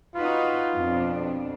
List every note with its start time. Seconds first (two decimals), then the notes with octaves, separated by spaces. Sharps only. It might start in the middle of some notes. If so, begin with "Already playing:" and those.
0.15 D#4 F4 F#4 B4
0.73 F2 B2 D4